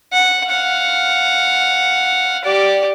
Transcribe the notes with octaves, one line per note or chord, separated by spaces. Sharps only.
F#5
F5 F#5
G4 D5